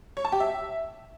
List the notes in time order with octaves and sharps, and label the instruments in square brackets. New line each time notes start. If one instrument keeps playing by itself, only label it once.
[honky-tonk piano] C#5
A5
G4
E5